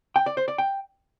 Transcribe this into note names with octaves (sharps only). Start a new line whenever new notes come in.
G5
D5
C5
D5
G5